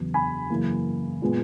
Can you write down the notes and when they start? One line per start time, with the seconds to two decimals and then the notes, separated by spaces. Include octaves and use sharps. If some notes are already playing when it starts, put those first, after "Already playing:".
Already playing: E2 C#3 F#3 B3
0.14 G#5 B5
0.50 F#2 C#3 E3 A#3
1.22 A#2 G#3 B3